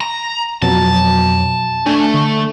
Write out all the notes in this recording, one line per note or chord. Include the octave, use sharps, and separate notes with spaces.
A#5
F2 B2 F#3 A5
A3 D4 G#5
D3